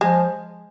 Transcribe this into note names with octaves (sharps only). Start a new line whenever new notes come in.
F3 G#3